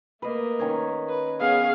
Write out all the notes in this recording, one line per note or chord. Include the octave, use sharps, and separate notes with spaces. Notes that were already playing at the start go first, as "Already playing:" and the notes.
A3 A#3 B4 D#5
D#3 C#4 C#5
B4
B3 C#4 G#4 F5 F#5